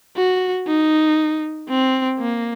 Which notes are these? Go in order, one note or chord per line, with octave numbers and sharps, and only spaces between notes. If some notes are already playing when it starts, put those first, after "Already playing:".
F#4
D#4
C4
A#3